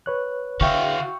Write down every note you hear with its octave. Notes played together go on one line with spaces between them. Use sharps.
B4 C#5 F#6
D3 F#4 E5 F5 G5 C#6